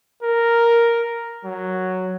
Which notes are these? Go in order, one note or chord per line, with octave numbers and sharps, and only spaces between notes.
A#4
F#3